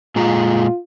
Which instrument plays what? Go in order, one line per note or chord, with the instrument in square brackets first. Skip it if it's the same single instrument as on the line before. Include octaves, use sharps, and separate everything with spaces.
[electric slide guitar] A#2 G#3 A#5 [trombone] F4